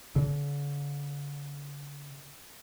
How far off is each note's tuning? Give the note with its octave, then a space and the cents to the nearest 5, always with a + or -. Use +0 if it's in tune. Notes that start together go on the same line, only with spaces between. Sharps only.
D3 -45